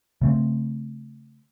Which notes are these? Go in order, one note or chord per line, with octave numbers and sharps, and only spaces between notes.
C#3 A3 C4